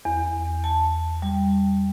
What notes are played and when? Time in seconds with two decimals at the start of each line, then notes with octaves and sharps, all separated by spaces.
0.05 E2
0.64 A5
1.22 G3